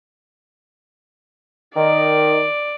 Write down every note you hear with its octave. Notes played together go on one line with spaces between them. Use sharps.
D#3 D5